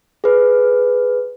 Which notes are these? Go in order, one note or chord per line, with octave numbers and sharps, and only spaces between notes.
G#4 B4